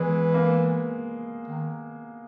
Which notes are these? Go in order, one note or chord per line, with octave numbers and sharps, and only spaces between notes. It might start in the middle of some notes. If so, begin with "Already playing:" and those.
Already playing: E3 G#3 B3
A#3
D#3